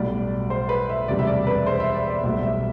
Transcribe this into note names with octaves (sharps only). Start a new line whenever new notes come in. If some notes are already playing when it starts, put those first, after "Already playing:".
Already playing: B1 A2 G3 D5
C5
B4
E5
E1 D2 C3 G3 D5
E5
D5
B4
C5
E5
D5
D5
B1 A2 G3 E5
E5